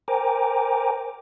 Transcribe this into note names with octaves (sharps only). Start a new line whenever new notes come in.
A#4 C5 G5 G#5 A#5 D6